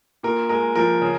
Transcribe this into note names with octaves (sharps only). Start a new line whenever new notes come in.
A#2 A#4
G#3 A#4
F3 A#4
C#3